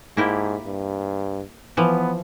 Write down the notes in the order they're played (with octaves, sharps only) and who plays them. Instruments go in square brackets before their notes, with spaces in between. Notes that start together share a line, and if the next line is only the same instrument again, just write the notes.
[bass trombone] G#2 [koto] A#3 E4 G4
[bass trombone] G2
[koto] E3 F3 [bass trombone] B3